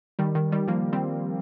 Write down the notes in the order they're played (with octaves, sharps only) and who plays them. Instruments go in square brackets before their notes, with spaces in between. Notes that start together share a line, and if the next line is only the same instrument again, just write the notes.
[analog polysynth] D#3 G3
D#3
D#3 G3
F3 A#3
G3 C4